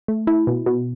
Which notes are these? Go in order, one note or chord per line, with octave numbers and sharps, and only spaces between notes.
A3
E4
B2
B2